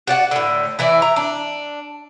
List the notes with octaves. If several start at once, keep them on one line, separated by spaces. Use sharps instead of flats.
F#4 D5 F#5
A2 D3
E3 E4 D5
A#5
D4